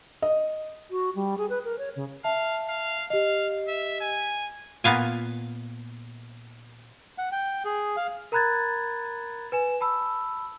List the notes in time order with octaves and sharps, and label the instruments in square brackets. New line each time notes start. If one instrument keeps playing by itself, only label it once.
[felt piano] D#5
[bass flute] F#4
G3
G#4
B4
A#4
C#5
C#3
[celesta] E5 A5 [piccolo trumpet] F5
[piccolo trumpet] F5
[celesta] G4 D#5 [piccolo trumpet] F5
[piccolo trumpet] E5
G#5
[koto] A#2 B3 F5 G#5
[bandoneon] F#5
G5
G#4
F5
[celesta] A#4 A#5 B5 F#6 G#6 A6
B4 G#5 E7
A5 B5 E6